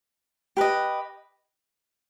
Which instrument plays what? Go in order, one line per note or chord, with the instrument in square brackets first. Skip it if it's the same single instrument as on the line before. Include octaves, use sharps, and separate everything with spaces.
[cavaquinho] G4 B4 D#5